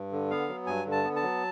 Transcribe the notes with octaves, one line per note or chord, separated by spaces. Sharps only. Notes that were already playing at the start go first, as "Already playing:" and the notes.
Already playing: G2
D3
B3 F5
F#3
G2 G#5
D3
A5
B3
A5
F#3